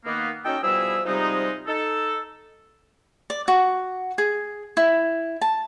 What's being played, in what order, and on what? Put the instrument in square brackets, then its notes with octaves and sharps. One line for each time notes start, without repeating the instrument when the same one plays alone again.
[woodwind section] D#3 A#3 B3
C#4 D#4 F#4 A4 D#5 G5
B2 F3 G3 E4 G#4 E6
C3 F3 G3 G#3 D#4
D#4 A4
[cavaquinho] D5
F#4
G#4
E4
A5